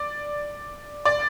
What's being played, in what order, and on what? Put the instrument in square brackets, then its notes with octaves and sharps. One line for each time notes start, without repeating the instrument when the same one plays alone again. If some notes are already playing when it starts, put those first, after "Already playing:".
Already playing: [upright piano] D5
D5